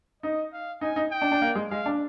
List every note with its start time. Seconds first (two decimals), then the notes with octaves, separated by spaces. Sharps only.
0.23 D#4 D#5
0.53 F5
0.81 D#4 G#5
0.96 D#4
1.11 G5
1.22 D4
1.32 D4
1.42 A#3
1.55 G#3
1.70 G#3 F5
1.86 D4